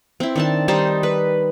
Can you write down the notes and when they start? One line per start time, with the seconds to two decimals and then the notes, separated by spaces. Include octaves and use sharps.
0.20 C4 E4
0.36 D#3 D4 A5
0.68 G3 D#4 C5 A5
1.03 B4